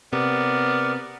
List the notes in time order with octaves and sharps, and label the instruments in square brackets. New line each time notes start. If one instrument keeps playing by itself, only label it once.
[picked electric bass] C3 [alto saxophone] B3 [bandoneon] A#4 D5